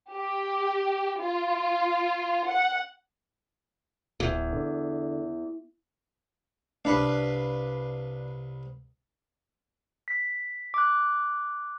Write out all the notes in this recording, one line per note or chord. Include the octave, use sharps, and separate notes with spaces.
G4
F4
F#5
D1 E2
D3
C2 D4 B4 F5
B6
D6 F#6